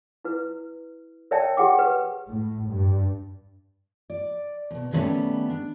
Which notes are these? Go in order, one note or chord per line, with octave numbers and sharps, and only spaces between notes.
E4 B4
A#4 C#5 D5 E5 G5 A5
G4 G#4 F#5 G5 D6
B4
A2
G2
D5
D#2 B2
D3 D#3 G3 A3 B3 C#4
D4